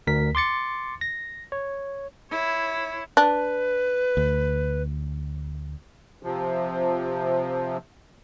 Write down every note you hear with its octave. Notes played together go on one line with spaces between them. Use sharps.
D2 A#4 B6
C6 D6 A6 C#7
A#6
C#5
E4 C#5
D4 B4
D2
C3 F3